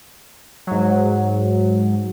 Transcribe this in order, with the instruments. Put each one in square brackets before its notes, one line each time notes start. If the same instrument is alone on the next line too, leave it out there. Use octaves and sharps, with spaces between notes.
[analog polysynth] G#2 F#3